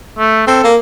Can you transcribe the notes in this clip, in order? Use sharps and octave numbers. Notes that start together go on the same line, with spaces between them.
A3
C4 A4
A#3